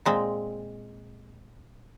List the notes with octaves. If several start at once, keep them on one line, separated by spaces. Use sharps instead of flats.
A#2 G#3 C4